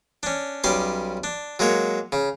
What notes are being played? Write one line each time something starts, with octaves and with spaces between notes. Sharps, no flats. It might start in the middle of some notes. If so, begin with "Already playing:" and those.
C#4 D4
B1 G3 C#4 C6 D6
D4
F#3 G#3 A#3 C#5
C#3